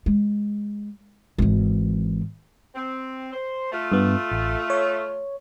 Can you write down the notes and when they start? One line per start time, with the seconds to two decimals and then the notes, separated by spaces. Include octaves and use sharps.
0.06 G#3
1.38 G#1 E3
2.75 C4
3.32 C5
3.71 A3 F4
3.92 G2 B3
4.32 A1
4.70 C#5